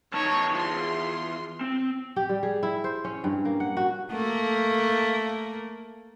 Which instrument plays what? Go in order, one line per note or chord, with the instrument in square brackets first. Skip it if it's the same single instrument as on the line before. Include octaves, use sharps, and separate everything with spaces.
[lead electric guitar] E2 A5 [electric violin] D#4 C#5
[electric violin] F4 C6
[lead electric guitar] C4
[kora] G4
G3
G#4
E4
C5
C#4
G2
A#3
F#5
F#4
[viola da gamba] A3 A#3